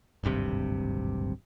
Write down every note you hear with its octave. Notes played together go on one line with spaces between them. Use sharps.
D1 G#1 G2 C3